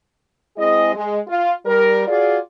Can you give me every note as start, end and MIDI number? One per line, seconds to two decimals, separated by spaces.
0.57 0.92 56
0.57 0.92 60
0.57 0.92 64
0.57 0.92 68
0.57 0.92 75
0.94 1.19 56
1.27 1.52 65
1.65 2.06 55
1.65 2.06 70
2.07 2.37 65
2.07 2.37 66
2.07 2.37 68
2.07 2.37 74